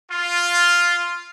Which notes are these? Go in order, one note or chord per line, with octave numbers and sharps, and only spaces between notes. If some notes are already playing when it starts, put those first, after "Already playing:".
F4